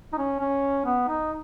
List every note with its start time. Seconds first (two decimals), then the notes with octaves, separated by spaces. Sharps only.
0.13 D#4
0.18 C#4
0.40 C#4
0.86 B3
1.08 D#4